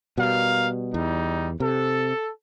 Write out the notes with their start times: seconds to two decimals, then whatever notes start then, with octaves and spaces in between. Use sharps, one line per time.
0.18 B2 G3 A#4 F5
0.94 E2 G3 D#4
1.60 C3 A4